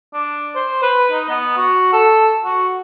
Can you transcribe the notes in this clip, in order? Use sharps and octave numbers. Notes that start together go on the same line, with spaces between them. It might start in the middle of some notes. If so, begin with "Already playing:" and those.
D4
C5
B4
D#4
B3
F#4
A4
F#4